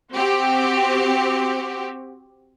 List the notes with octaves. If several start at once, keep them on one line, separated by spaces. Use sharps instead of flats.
C4 F#4 G4